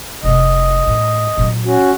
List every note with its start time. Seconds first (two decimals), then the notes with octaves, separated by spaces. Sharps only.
0.23 F1 C3 D#5
0.87 A2
1.37 A#2 F#3
1.65 C#4 F#4